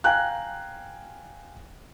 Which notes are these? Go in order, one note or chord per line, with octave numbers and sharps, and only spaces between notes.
F5 G5 G#5 A#5 F#6